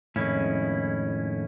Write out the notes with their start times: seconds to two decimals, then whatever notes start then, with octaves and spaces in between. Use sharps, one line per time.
0.16 F2 A2 D#3 G#3 C#4 E4